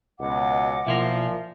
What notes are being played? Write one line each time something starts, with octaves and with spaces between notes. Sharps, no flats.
C#2 B2 D#5 F#5 D6
B1 A#2 F3 E4 F4 E5 A#6